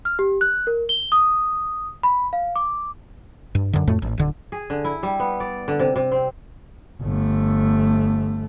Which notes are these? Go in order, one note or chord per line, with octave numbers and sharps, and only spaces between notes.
F6
G4
F#6
A#4
G7
D#6
B5
F5
D6
G2
F#2 D3
F2 A2 A3
A1
D1 D3
G#4
D3
E4
G3
B3
D5
D3
C3
C3
C4
G1 A3